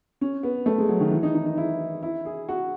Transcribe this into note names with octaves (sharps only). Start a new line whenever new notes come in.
C#4
B3
A3
G#3
F#3
D#3
E3
D#4
D#4
D#4
E4
E4
G#4
F#4